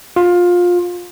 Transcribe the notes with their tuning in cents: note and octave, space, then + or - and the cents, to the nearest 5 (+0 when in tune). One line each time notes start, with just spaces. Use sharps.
F4 +20